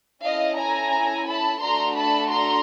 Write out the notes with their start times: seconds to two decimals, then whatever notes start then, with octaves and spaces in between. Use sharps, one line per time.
0.23 C#4 E4 A4 D#5 F5
0.58 G#5 A#5
1.27 A5 B5
1.62 A3 D4 F#4 A4 A#5 C6
1.96 A5 B5
2.31 A#5 C6